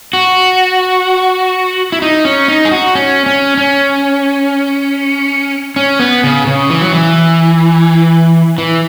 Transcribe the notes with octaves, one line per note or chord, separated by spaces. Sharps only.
F#4
E4
D#4
C#4
D#4
G#4
F#4
C#4
C#4
C#4
C#4
B3
C#3
C#3
E3
F#3
E3
E3